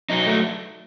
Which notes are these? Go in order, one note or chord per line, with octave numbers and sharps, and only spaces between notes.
F#3 D#4
A3